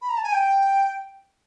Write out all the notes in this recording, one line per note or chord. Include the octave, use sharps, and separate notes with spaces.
B5
A#5
A5
G#5
G5